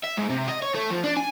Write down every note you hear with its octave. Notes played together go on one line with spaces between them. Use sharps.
E5
G#2
C3
D#5
C#5
A3
F3
D4
G#5